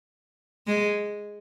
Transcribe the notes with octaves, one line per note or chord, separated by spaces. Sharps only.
G#3